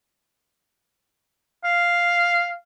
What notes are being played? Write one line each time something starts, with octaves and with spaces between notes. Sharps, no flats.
F5